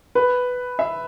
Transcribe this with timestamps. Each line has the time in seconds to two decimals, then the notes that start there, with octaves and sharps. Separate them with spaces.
0.15 B4
0.79 E5